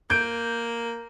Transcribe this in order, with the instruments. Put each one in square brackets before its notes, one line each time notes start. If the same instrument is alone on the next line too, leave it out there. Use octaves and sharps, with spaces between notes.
[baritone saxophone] A#3 [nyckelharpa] A#4 [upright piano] G6 D7